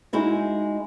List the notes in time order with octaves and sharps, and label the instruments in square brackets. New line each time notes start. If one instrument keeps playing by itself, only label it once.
[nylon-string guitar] G#3 D#4 E4 F#4